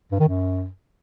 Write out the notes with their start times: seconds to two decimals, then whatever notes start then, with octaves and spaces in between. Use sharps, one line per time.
0.11 G2
0.20 D#3
0.29 F#2